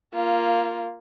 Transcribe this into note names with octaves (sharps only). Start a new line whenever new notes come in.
A#3 F4